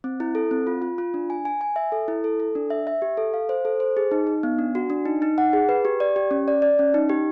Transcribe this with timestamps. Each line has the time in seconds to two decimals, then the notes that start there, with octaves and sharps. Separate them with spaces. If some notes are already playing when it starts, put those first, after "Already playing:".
0.04 C4
0.20 E4
0.35 A4
0.51 C4
0.67 F4
0.82 F4
0.98 F4
1.14 D4
1.30 G#5
1.45 G#5
1.61 G#5
1.76 E5
1.92 A4
2.08 E4
2.24 A4
2.40 A4
2.55 D4
2.70 E5
2.87 E5
3.02 G4
3.17 A4
3.34 F5
3.49 C5
3.65 A4
3.80 C5
3.97 G#4
4.11 D#4
4.27 D#4
4.43 B3
4.59 D4
4.75 F#4
4.90 D4
5.06 D#4
5.22 D#4
5.38 F#5
5.53 G#4
5.69 B4
5.85 G4
6.00 D5
6.16 G4
6.31 C#4
6.48 D5
6.62 D5
6.79 C#4
6.94 D#4
7.09 G4